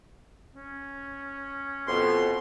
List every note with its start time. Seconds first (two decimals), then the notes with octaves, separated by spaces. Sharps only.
0.54 C#4
1.88 F2 B2 C6